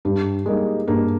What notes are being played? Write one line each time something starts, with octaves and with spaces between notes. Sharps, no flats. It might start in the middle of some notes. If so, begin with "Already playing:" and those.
G2 G3
G3 G#3 A#3 D#4
G2 A#3